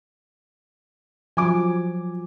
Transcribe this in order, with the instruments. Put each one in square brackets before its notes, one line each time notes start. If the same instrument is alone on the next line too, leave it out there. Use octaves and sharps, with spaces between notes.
[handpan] F3 F#3 [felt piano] G#5 D6